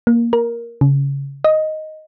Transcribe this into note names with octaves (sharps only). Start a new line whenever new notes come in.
A#3
A#4
C#3
D#5